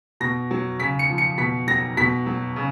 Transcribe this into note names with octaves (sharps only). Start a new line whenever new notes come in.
B2 A#6
F#3
C#3 B6
C#7
F3
C#7
B2 B6
F#3 A#6
B2 B6
F#3
C#3